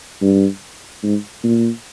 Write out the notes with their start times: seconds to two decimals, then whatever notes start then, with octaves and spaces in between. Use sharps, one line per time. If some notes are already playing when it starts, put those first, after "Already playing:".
0.21 G2
1.03 G#2
1.44 A#2